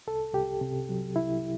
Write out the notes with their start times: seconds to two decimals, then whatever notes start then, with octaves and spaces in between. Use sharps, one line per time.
0.07 C2 A4
0.34 C2 G4
0.61 C3
0.89 F#3
1.15 C2 E4